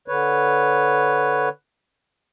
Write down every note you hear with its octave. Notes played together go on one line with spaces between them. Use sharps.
D3 B4 C#5